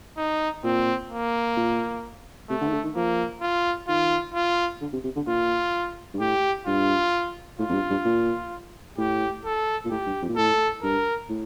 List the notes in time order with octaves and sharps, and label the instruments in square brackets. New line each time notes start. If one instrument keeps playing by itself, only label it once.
[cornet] D#4
[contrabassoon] A#2 [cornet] C4
[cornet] A#3
[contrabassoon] A#2
[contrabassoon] C3 [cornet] A3
[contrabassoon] D3
D#3
D3
D#3
[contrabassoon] F3 [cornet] A#3
[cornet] F4
[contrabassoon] D#3 [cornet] F4
[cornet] F4
[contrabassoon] D3
C3
C3
D3
[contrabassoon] A#2 [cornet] F4
[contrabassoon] G2
[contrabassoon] A2 [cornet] G4
[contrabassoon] G2 [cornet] F4
[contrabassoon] A2 [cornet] F4
[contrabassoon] F2
G2
G2
A#2
[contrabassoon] A2 [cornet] G4
[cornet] A4
[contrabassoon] A#2
[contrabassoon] A2 [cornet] G4
[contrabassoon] G2
F2
A#2
[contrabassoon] A2 [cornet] A4
[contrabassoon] G2 [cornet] A#4
[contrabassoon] A2